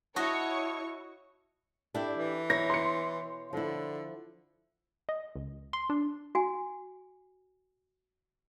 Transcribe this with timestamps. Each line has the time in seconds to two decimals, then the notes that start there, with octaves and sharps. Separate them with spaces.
0.16 E4 F#4 C#5 D#5 A5 C#6 D#6
1.94 D4 E4 G4 A4 E5 G5
2.17 E3
2.50 B2 E4 C#5 A#6
2.70 C6 C#7
3.53 D3 F3 E4
5.09 D#5
5.35 C#2
5.73 C6
5.90 D4
6.35 F#4 G#5